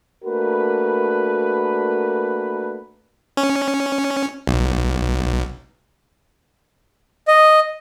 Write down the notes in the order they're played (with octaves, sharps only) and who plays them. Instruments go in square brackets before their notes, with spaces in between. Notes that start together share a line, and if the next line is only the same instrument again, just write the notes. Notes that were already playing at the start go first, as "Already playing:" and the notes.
[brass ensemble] A3 A#3 D4 F#4 A#4 B4
[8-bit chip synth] C#4
B1
[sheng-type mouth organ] D#5